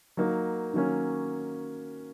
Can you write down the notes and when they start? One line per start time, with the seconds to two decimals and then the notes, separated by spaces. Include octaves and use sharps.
0.17 F#3 A#3 D#4
0.73 D#3 F#3 A#3 C#4